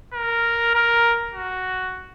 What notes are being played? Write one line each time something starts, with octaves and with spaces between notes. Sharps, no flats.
A#4
A#4
F#4